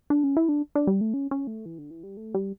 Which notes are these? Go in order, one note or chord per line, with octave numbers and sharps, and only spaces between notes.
D4
C#4
E4
D4
D4
G3
A3
C#4
C#4
A3
E3
D3
E3
G3
A3
G3